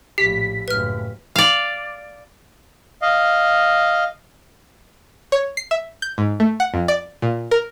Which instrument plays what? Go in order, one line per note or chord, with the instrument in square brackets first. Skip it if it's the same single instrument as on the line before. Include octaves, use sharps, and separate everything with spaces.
[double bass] A#1 A2 [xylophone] G4 [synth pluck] B6
[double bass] F#1 A2 [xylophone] B4 F6
[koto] D5 F5
[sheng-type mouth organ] D#5 F5
[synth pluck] C#5
C7
E5
G6
G#2
A3
F#5
F2
D5
A#2
A#4